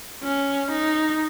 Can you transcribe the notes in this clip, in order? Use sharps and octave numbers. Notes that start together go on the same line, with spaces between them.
C#4
D#4